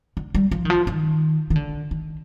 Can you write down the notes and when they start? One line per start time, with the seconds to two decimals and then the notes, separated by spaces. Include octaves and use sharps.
0.17 D3
0.35 G3
0.51 F3
0.65 D#3
0.70 F3
0.87 D#3
1.50 D#3
1.56 D3
1.91 D#3